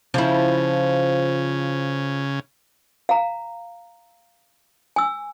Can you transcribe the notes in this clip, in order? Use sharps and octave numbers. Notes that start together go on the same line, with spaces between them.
C#3 F3 E4
F5 A#5
G#5 E6